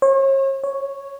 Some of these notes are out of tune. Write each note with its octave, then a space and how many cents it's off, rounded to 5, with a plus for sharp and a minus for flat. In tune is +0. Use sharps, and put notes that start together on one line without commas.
C#5 -40
C#5 +0